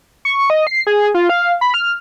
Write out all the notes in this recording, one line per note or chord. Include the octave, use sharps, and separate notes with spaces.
C#6
D#5
C7
G#4
F4
F5
B5
F6